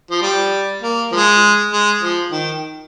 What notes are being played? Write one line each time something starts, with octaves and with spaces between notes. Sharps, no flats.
F3
G3
A#3
F3 G#3
G#3
F3
D#3